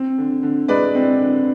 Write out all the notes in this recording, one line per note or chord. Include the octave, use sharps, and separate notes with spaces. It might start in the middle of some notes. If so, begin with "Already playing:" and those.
Already playing: C4
D3
D3
G#3 B4 D5
C4
D3